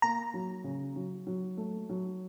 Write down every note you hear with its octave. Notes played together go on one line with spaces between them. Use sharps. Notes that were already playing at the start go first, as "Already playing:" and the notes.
A#3 A#5
F#3
C#3
F#3
F#3
A3
F#3